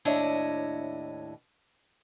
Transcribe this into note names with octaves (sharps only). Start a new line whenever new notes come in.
D#2 A2 D4 E4 C#5 D#5